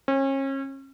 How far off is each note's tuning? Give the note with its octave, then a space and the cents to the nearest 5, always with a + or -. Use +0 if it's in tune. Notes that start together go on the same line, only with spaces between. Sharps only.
C#4 -35